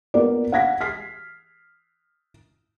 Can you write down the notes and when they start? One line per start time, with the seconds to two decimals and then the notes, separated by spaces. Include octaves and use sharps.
0.14 A#3 B3 F4 A#4 D5
0.52 F5 F#5 G#6 A#6 B6
0.81 F6 B6 C7